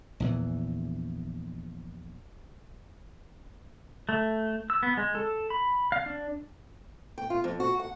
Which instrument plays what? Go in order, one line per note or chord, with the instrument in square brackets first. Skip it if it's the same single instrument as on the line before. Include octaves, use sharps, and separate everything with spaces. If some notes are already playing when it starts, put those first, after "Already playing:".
[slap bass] A#1 E2 E3
[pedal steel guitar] A3
E6
B3
G#3
A4
B5
F5
D4
[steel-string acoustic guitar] G5
F4
F2
F#4
F#5